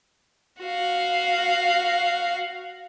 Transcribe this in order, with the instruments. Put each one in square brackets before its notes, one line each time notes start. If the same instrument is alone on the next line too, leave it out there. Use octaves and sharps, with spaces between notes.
[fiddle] F#4 F5